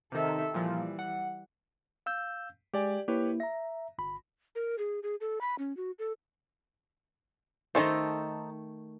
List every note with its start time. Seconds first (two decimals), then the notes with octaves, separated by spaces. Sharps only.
0.12 C3 D#3 A4 E5
0.54 A#2 E3 F3 G3
0.99 F#5
2.06 F5 E6 G6
2.74 G#3 G4 D5 G#5
3.08 A#3 E4 G4 B4 C#5
3.40 E5 A#5 A#6
3.98 G1 B5
4.55 A#4
4.79 G#4
5.03 G#4
5.21 A4
5.41 B5
5.59 C#4
5.77 F#4
5.99 A4
7.75 D#3 A3 D#4 A4 C5